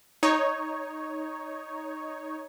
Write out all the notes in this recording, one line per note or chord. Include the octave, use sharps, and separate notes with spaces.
D#4 C#5